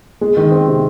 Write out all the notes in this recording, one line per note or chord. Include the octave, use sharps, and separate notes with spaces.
G#3
D#3
C4
C3